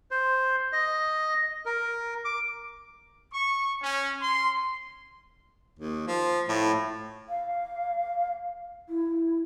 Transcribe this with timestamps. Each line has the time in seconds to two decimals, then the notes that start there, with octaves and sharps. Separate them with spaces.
0.11 C5
0.73 D#5
1.66 A#4
2.25 D6
3.33 C#6
3.82 C#4
4.21 C6
5.79 D#2
6.07 F3
6.49 A2
7.29 F5
8.89 E4